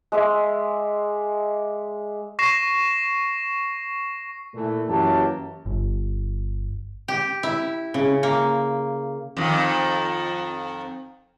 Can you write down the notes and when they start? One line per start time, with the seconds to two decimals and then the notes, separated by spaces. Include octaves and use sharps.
0.12 G#3 D5 E5
2.39 C#6 A#6 C7 E7
4.54 A#2 E3 A3
4.89 F#2 E3 F#3 A#3 G4 A5
5.66 G1
7.08 G4
7.43 E4
7.94 C#3
8.23 A#3
9.37 F2 D#3